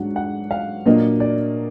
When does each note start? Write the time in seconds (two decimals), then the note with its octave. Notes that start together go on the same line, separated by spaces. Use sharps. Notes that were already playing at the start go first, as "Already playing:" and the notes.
Already playing: G#2 F#3 D4 F#5
0.16 F#5
0.51 F5
0.86 A#2 F#3 A#3 D4 D#5
1.20 D5